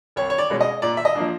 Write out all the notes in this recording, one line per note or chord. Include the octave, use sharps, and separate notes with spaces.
C2 C#5
C#5
D5
B2 G#3 C#4
D#5
A#2 D5
E5
D#5
F3 A#3 D4